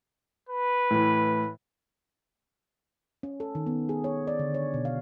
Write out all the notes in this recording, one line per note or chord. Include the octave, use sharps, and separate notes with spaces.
B4
A2 E3
C#4
A4
D#3
B3
G#4
C#5
D5
D3
C#5
B2
F5